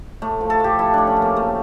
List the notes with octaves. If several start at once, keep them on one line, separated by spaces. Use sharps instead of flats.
A2 A3
F3
A4
A2 G4
F3 E4
A2 D4
C#4
F3
A#3
C#3 A3